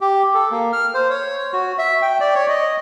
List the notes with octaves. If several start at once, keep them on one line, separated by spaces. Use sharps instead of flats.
G4
A4
A#3
F6
C5
C#5
F#4
E5
G5
D5
C#5
D#5